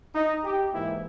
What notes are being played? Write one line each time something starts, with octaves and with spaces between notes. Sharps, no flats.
D#4
G4
G#2 E3 A#3 E4